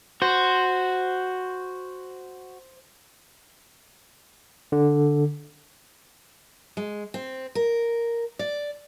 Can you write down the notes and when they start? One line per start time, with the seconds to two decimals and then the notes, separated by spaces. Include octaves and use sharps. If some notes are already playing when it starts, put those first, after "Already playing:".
0.22 F#4 C5
4.72 D3
6.77 G#3
7.14 C4
7.55 A#4
8.39 D5